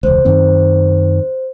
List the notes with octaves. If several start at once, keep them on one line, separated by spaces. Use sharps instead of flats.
E1 C#2 C5
F#2 D#3 C4